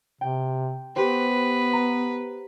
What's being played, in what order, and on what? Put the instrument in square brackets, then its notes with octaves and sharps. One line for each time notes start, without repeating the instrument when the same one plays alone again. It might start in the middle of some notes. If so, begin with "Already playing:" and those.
[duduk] C3 [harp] G5
[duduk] B3 [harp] G4 C5 [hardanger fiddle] B4
[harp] A#5